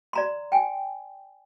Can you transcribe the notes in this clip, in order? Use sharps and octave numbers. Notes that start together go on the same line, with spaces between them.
D5 A#5 C6
G5 G#5